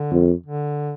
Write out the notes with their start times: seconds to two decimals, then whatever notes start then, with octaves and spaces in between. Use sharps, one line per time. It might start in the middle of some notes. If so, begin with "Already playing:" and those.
Already playing: D3
0.11 F2
0.46 D3